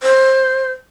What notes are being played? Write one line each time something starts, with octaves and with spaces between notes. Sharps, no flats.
C5